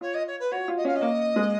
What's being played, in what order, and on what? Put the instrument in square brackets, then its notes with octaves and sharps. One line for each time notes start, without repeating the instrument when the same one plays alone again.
[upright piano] F4 [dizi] C#5
[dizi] D#5
C#5
B4
[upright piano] F#4 [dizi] C#5
[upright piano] F4
[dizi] D#5
[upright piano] C#4 [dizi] F5
[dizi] D#5
[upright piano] A#3
G#3